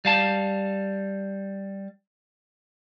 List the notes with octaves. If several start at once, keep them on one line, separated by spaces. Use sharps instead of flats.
G3 F5 A5